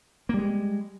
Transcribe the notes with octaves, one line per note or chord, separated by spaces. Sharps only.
G3 G#3 A#3